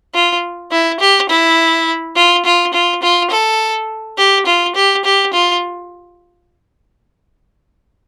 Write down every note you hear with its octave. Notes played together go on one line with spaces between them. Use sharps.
F4
E4
G4
E4
F4
F4
F4
F4
A4
G4
F4
G4
G4
F4